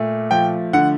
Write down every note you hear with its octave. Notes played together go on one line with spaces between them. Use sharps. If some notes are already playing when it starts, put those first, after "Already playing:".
Already playing: A#2 A3
F3 G5
D3 F#5